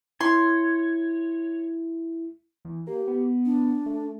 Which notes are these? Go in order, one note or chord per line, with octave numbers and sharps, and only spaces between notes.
E4 C#5 C6
E2
A#3 G4
B3
D4
A3